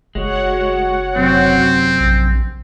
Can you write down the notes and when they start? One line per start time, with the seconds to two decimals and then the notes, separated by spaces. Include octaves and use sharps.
0.15 F#1 G#3 F#4 C#5 F#5
1.16 F#2 C3 C4
2.00 A#1